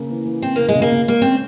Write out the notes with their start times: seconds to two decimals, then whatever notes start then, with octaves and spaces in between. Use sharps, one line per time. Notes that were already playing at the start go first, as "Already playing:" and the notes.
Already playing: C#3 A#3
0.10 E3
0.26 E3
0.42 E3 C4
0.56 C#3 A#3
0.68 G#3
0.75 C#3
0.82 A#3
0.92 C#3
1.08 G#3 A#3
1.22 C4 C#4